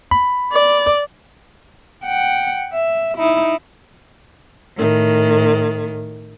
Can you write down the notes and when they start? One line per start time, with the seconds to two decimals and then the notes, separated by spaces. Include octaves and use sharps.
0.11 B5
0.53 D5
2.05 F#5 G5
2.73 E5
3.18 D#4 E4
4.76 A2 D#3